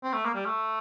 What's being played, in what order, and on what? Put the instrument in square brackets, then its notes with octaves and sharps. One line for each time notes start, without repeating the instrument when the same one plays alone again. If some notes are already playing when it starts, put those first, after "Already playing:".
[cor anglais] C4
A3
A#3
G3
A3